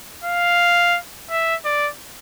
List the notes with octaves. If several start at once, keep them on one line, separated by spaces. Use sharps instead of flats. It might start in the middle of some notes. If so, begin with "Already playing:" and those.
F5
E5
D5